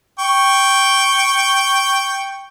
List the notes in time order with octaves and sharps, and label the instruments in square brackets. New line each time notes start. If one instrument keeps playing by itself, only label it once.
[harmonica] G5 C#6